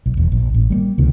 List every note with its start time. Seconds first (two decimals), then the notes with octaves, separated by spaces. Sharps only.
0.06 B1
0.17 E1
0.32 A#1
0.54 A1
0.70 G3 G#3 A#3
0.98 C#2 C3 D#3